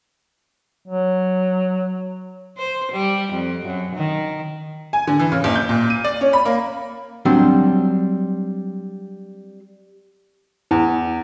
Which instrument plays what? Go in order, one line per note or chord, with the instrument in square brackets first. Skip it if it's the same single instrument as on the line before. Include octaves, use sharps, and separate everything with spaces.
[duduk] F#3
[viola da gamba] C5
G3
F2
F#2
D#3
[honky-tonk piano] G#5
D3
E3
C#3
F#1
G6
A#2
D#7
D5
C#4
B5
A#3
[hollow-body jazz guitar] F#3 G3 C4 D4
[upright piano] E2